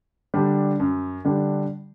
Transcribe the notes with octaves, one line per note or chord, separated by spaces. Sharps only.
D3 G3 D4
F#2
D3 G3 D4